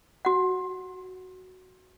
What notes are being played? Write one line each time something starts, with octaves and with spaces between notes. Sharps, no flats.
F#4 F#5